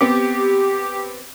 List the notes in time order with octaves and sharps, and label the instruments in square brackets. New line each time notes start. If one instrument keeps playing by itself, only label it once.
[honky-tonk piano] B3 C4 [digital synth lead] G4